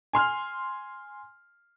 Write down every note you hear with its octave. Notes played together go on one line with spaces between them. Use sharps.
G#5 C6 F6